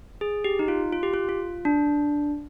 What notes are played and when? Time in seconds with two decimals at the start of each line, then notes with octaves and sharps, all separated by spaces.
0.21 G#4
0.44 G4
0.59 D#4
0.68 F4
0.93 F4
1.03 G4
1.14 F4
1.29 F4
1.65 D4